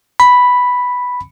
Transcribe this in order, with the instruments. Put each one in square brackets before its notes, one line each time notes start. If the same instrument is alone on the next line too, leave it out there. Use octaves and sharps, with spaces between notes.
[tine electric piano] B5